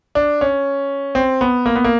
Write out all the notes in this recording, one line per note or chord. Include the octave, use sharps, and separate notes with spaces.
D4
C#4
C4
B3
A#3
B3
A#3